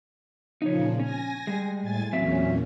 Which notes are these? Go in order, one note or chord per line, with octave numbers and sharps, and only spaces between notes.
A#2 C#3 F3 D#4 C#5
C#4 G#5 A#6
G3 G#3
A2 G#5 A6
E2 A#2 F#3 C4 C#4 E5